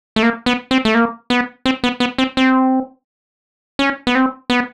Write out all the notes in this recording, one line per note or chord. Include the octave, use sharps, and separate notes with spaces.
A3
A#3
B3
C4
A3
A#3
B3
C4
B3
B3
C4
C4
C#4
B3
C4
B3